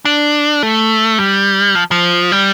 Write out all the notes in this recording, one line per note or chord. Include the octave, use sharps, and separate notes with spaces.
D4
A3
G3
F3
F3
G3